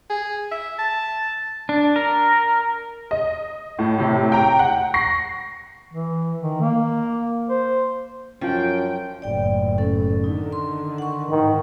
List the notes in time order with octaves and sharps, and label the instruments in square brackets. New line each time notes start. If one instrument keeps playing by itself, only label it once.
[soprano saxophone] G#4
E5
A5
[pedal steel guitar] D4
A#4
[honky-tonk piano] D#5
A2
A2 C3
G5 A#5
F#5
C#6 A#6 C7
[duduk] E3
D#3
A#3
C5
[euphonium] F#2 [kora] F3 [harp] C#4 F4 [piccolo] G5
[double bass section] F#1 A2 [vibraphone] D5 G5
[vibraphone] C#4 A4
[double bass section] D3 D#3 [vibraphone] D#4
[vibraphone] C6
F#5 C#6
[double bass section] G#2 E3 [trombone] D#3